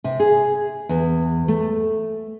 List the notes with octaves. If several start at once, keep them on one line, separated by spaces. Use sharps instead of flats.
C3
G#4
E2
A3